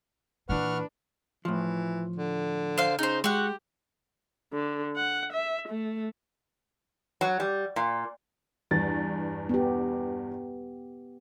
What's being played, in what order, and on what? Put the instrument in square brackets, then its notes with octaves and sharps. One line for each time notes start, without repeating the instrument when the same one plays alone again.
[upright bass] A#2 E3 [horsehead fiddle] D4 [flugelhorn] B4 [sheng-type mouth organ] F#5 C#6 F6
[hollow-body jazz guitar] A2 F3 [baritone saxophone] E3
[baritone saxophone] D3
[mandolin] C5 F5
[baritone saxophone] C#3 [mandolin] D#4 C5
[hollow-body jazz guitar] G#3 [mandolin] F#4 F#5 [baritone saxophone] G4
[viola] D3
F#5
E5
A3
[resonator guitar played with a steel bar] F#3
G3
A#2
[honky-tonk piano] E2 G2 A6
[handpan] B3 G4